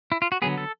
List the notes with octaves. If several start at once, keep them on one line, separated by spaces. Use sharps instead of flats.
E4
F4
F#4
D3 F#3 B3 G#4
A4